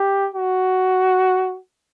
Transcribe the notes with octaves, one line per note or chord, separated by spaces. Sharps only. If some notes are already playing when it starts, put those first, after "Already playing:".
Already playing: G4
F#4